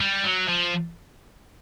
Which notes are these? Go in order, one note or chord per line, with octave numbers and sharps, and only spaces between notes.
G3
F#3
F3